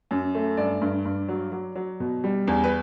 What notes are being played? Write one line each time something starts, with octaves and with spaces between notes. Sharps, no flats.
F#2
A3
G2 D5
G2
G2
F#3
F#3
F#3
B2
G3
E2
B4